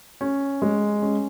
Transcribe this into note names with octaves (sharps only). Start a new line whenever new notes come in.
C#4
G#3
C#4